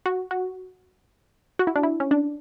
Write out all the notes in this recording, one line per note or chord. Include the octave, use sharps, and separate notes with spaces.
F#4
F#4
F#4
E4
D4
E4
C#4
D4